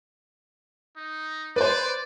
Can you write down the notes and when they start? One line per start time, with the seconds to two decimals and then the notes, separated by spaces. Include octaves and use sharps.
0.97 D#4
1.56 B4 C5 D5